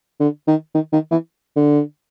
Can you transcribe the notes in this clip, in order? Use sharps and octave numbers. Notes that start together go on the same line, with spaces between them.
D3
D#3
D#3
D#3
E3
D3